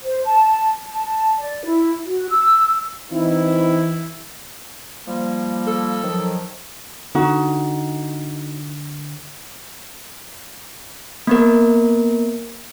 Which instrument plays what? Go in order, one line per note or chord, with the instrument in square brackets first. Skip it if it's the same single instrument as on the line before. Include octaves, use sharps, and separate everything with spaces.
[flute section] C5
A5
A5
D5
E4
F#4
E6
[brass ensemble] E3 E4 [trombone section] C4 D#4
[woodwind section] F3 G3 A#3
[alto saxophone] A4
[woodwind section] D#3 F3 F#3
[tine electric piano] D3 [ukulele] D#4 F#4
[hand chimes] A#3 B3 A#4